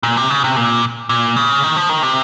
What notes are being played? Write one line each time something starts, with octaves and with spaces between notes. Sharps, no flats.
A#2
C3
C#3
C3
A#2
A#2
C#3
D#3
F3
D#3
C3